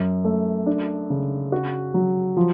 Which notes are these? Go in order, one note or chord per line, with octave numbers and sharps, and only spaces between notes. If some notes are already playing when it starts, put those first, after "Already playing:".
Already playing: F#2
A3
D4
C#3
F#4
F#3
F3